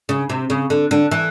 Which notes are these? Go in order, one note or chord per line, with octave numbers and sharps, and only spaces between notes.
C#3
C3
C#3
D3
D3
E3